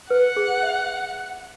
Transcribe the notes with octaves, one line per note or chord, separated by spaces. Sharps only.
B4 F#5
G#4
E5